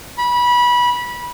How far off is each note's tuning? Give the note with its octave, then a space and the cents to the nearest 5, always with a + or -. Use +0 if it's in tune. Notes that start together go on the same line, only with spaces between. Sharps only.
B5 -20